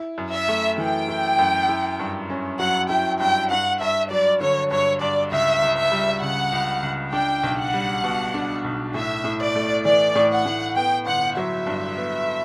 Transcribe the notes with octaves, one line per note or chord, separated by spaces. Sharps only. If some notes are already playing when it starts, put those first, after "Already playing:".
Already playing: E4
F#2
E5
A3
E3 G5
E4
F#2
E4
G2
C#4
F#3 F#5
E4 G5
G2 G5
G2 F#5
G2 E5
F#3 D5
D3 C#5
G2 C#5
G2 D5
C#2 E5
C#2
E5
G3
C#3 F#5
C#2
C#2
D4 G5
B1
F#5
G3
B2
D4
B1
A2 E5
A2
D5
A3
E3 D5
A2
F#5
A2
B3 G5
G1 F#5
F#3 E5
G2
B3